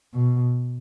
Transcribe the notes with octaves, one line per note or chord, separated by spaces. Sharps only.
B2